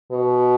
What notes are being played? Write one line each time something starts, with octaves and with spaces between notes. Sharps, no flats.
B2